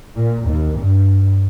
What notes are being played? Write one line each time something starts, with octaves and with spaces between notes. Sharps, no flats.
A#2
D#2
G2